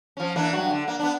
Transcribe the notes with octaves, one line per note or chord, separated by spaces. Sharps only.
F3 C#4
E3 A#3 D4
G2 F#3 F#4
D3
A#3
B3 D4